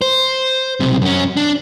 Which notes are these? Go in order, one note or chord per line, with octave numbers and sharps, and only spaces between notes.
C5
B1 C3
F#2 C#4
D4